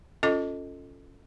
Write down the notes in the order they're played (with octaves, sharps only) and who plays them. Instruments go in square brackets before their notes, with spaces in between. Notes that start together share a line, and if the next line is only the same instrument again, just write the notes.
[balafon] C#4 F4 A4 D#5 D6